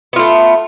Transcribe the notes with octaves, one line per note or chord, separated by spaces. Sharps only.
A3 B3 F4